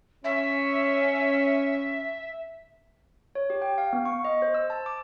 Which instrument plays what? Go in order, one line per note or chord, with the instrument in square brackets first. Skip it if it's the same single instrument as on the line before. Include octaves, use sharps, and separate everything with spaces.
[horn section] C#4 [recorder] E5
[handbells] C#5
G4
G5
F5
B3
C#6
D#5
C5
E6
A5
D6